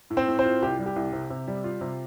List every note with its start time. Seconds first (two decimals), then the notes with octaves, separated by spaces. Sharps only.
0.10 A2
0.17 C4 C5
0.28 A2
0.39 C4 C5
0.44 F4
0.62 C2 G4
0.79 G3
0.86 G4
0.96 C2
1.13 C3
1.30 C3
1.47 G3
1.64 F4
1.81 C3